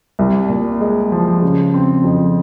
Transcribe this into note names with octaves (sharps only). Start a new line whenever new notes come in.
C2
A#2
G#3
F3
C#3
C4
F2